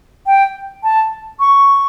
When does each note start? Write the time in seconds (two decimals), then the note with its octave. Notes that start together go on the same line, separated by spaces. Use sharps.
0.27 G5
0.83 A5
1.40 C#6